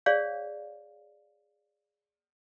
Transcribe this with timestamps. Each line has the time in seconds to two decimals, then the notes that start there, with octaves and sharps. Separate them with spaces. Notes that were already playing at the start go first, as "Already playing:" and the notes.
0.06 G#4 C#5 D5 F5